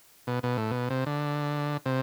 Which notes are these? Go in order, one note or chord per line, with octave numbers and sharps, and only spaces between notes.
B2
B2
A2
B2
C3
D3
C3